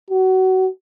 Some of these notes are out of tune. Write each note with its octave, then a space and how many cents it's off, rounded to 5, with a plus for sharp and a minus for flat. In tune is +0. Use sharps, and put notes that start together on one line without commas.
F#4 +25